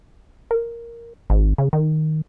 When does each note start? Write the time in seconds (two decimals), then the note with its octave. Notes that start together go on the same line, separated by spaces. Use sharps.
0.51 A#4
1.30 G#1
1.58 C#3
1.73 D#3